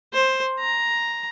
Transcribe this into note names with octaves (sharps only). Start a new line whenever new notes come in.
C5
A#5